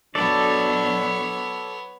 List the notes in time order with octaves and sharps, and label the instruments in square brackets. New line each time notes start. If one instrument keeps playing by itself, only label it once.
[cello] B2 F#3 [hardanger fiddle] B3 C#5 [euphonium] D4 [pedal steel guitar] A4 D5